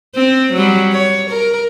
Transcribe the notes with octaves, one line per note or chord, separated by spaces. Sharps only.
C4
F#3 G3
C#5
A#4